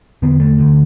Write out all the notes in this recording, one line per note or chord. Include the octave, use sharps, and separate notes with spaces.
E2 D3 B3
A3
D2 D3